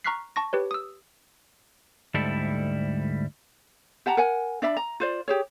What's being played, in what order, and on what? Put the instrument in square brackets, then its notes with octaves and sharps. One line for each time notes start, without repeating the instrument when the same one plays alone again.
[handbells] A#5 C#6 F6 F#6 B6 C7
A5 C#6 A#6
G4 B4 C#5
D#6 E6
[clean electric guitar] D2 G#2 G3 E4 A4
[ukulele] G4 F#5 A5 A#5
A#4 F#5 G#5
D4 D5 E5 B5
A#5
F4 C5 D5
G4 G#4 C#5